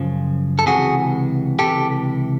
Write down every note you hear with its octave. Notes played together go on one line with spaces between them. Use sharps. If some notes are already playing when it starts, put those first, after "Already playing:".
Already playing: F#2 C#3 F3
A4
C#2 C3 E3 F#4 G#4
C#2 C3 E3 G4 A4